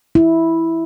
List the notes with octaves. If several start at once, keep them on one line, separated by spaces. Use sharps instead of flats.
E4